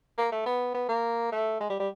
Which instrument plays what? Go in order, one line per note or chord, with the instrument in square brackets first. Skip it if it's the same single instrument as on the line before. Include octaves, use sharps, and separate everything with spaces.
[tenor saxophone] A#3
A3
B3
B3
A#3
A3
G#3
G3
G3